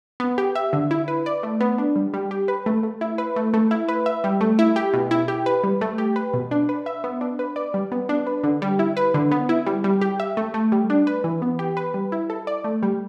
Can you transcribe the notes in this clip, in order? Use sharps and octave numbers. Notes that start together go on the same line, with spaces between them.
B3
G4
E5
D3
E4
B4
D5
A3
B3
D4
G3
G3
G4
B4
A3
A3
E4
B4
A3
A3
E4
B4
E5
G3
A3
E4
G4
B2
E4
G4
B4
G3
A3
G4
B4
B2
D4
B4
E5
B3
D4
B4
D5
G3
B3
D4
B4
D3
G3
E4
B4
D3
B3
E4
G3
G3
G4
E5
A3
A3
G3
D4
B4
E3
B3
G4
B4
G3
E4
A4
D5
A3
G3